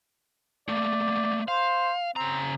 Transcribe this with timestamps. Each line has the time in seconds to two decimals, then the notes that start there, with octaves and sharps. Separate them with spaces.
0.68 A3 A#3 D5
1.48 C5 F5
2.16 C#3 C4 A#5